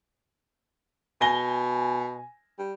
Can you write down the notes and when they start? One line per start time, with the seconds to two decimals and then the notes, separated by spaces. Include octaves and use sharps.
1.21 B2 G#5 A#6 G7
2.59 G3